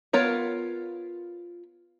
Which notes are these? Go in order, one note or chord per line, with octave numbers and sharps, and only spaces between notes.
B3 F4 A#4 C#5